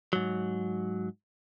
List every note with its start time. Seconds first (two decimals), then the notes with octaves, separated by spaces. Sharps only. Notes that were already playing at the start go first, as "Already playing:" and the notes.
0.13 G#2 F#3